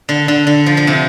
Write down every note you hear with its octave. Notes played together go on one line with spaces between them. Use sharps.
D3
D3
D3
F3
D3
C3